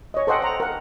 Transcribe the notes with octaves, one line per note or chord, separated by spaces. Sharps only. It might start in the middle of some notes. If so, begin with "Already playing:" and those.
C#5 D#5
A4 C5 D#5 F#5 G5
F#5 A#5
A#4 F#5